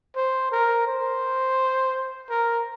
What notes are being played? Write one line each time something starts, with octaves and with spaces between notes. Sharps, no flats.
C5
A#4
C5
A#4